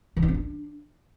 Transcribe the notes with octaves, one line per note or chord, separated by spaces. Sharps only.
E3
D#4
C4
D4